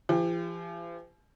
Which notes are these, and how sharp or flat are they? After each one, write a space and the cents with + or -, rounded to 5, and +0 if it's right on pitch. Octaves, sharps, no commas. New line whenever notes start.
F3 -45 G4 +30